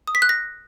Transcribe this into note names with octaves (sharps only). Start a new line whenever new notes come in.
D#6
B6
F#6
A#6